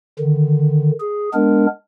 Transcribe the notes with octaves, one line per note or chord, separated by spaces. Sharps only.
D3 D#3
G#4
G#3 B3 D4 A#4